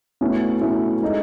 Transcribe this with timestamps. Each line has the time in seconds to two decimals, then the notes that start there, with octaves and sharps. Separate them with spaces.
0.21 B2 A3 C#4 E4
0.61 B2 A3 C#4 E4
1.02 G#3 D#4 A4 D#5